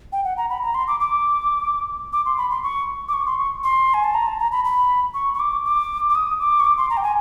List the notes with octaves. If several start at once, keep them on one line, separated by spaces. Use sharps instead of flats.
G5
F#5
A#5
B5
A#5
C6
D6
D6
D6
C6
B5
C6
C#6
D6
C#6
C6
C#6
C6
G#5
A5
A#5
A5
A#5
B5
B5
C#6
C#6
D6
D6
D6
D#6
D6
C#6
D6
C6
A#5
G5
G#5